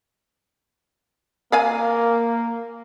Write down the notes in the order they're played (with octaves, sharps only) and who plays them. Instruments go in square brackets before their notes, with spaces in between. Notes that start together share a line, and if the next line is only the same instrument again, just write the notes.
[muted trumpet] A#3 [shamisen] A#4 F5 G#5